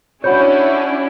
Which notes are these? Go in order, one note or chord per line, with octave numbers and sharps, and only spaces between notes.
C#4 D4 E4 F#4 C#5 F#5 B5 G6